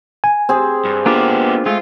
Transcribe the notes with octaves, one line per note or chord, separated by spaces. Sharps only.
G#5
C4 G#4
G2
A#3 B3 D4 F4 G4
G#3 A3 F4